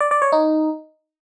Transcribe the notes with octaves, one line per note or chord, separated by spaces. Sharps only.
D5
D5
C#5
D#4